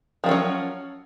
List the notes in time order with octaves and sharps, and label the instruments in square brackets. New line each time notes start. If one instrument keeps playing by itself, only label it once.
[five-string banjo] F3
D#3
C#4
F#3